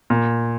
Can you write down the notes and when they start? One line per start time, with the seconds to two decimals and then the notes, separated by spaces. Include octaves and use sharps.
0.10 A#2